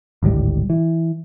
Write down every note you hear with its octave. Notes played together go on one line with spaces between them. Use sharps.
G#1 D2 A2 G3
E3